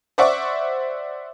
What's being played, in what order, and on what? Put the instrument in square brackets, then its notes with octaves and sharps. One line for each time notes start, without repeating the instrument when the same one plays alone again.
[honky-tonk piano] C5 D5 E5 F#5 C#6 D6